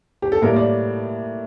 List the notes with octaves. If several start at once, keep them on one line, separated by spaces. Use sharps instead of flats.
G4
A4
A2 G3 A#3 A#4
D5